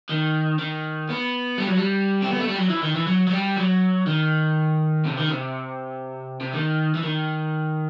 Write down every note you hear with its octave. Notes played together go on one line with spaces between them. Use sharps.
D#3
D#3
B3
G3
F#3
G3
C4
B3
A3
G3
F#3
E3
D#3
E3
F#3
F#3
G3
F#3
D#3
C3
D#3
C3
C3
D#3
E3
D#3